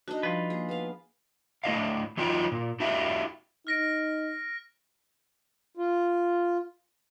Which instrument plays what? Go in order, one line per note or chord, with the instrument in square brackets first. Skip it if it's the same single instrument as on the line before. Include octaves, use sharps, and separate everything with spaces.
[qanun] D4 D#4 [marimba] F#4
[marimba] F3 G3 [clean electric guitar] F4 B4
[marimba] A#3 [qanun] G#4
[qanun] B3 F5
[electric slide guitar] A3 E4 D#5 F5
E3 F#3 D#4 F4 G5
A#2
E4 F#4 G4 E5
[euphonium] D#4 [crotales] F6 A#6 D7
[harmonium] F4